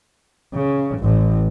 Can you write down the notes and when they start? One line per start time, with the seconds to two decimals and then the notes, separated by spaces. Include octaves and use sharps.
0.55 C#3
0.99 A1 A2